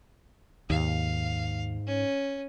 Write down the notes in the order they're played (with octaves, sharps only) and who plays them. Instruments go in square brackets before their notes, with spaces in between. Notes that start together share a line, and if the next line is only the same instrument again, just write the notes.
[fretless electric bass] D#2 [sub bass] G#2 [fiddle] F5
[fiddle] C#4